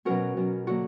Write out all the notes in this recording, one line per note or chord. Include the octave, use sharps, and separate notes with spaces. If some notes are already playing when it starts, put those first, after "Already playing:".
B2 F#3 C#4 F#4 A#4
B2 F#3 C#4
D3 F#3 A#3 F#4